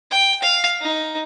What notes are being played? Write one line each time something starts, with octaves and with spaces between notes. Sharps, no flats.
G5
F5
D#4